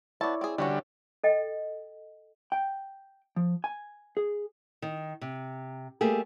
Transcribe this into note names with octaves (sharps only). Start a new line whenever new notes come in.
B3 E4 C#5 D5 A5
C4 G#4
D3 E3 G3 C#4 F#4
A4 D#5 G5
G5
F3
G#5
G#4
D#3
C3
G3 A3 A#3 G4 G#4